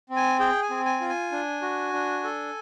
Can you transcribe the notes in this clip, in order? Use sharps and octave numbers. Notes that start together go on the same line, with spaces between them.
C4
G#5
G#4 G5
G#5
C4
G#5
F4
G#5
D4
F#4
D4
A4